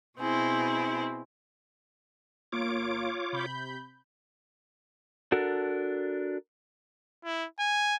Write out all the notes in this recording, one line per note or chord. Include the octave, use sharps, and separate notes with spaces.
B2 C4 E4 G#4
G1 A#3 F4 C#5 D6 D7
C3 B5 G6
D4 F#4 A4 A#4
E4
G#5